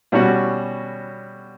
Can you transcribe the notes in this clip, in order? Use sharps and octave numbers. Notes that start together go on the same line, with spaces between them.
B2 G3 C#4 F#4